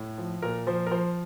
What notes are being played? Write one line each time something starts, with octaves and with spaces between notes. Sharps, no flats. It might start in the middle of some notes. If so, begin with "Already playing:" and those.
Already playing: A2
F3
A#2 A#4
F3 C5
A#4
F3 C5